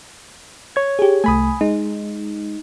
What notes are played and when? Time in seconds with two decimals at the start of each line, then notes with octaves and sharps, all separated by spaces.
0.76 C#5 G#6
0.99 G4 G#4
1.24 C2 A3 G#5 B5 D#6
1.61 G#3 D#4